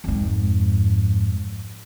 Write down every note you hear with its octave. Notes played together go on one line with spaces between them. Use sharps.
F2 G#2